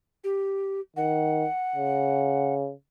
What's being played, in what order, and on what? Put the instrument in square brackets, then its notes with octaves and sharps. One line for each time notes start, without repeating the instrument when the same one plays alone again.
[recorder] G4
[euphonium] D#3 [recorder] F#5
[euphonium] C#3